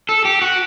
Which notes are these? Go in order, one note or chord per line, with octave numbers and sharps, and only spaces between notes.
A4
G4
F#4